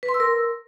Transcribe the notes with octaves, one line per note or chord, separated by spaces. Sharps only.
B4
C6
E6
A#4